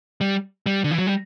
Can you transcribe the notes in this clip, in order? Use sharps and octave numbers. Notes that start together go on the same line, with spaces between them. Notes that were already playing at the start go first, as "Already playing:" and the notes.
G3
G3
D3
E3
F#3
G3